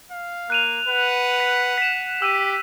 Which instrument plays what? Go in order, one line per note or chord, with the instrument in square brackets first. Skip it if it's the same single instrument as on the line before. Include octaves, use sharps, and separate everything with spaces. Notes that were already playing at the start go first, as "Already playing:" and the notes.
[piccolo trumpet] F5
[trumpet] A#3 [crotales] F#6 D#7 F7
[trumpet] B4 [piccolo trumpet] F#5
[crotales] B6
B6 E7
[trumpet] G4 [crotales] E6 D#7 E7